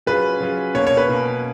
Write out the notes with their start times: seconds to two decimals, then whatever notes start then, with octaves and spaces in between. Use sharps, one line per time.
0.06 F#3 C#4 F4 G#4 B4
0.40 F#3 C#4 F4 G#4
0.74 B2 A#3 C#4 C#5
0.87 C#5
0.97 B4
1.09 B2 A#3 C#4